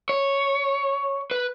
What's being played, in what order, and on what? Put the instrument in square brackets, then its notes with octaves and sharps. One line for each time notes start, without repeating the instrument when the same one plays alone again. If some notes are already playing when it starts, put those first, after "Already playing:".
[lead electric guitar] C#5
B4